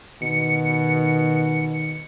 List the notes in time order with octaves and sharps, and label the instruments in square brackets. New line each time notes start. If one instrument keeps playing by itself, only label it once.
[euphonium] B2 [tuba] D#3 [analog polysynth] C#7